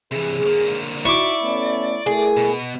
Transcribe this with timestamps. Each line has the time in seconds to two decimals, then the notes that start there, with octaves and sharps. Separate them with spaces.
0.12 C3 E3 G#4
0.46 D3 A#3
1.05 D#4 E4 F#4 D5 C#6 D6
1.42 A3 B3 C#4
2.06 A3 E4 G#4 A#4
2.37 B2